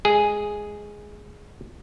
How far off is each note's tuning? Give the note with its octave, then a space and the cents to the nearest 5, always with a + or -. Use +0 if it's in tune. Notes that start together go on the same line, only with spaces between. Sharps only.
G#3 +0 G#4 +0